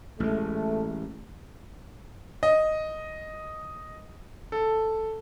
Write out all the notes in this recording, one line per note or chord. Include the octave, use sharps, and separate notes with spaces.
A1 G#3 A3
D#5
A4